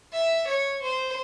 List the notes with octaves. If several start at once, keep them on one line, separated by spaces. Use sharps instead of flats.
E5
C#5
C5